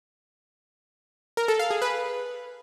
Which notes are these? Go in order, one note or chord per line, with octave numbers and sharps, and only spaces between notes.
A#4
A4
F5
G#4
B4